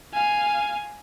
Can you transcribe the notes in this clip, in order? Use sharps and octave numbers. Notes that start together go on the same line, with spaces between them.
F5 G#5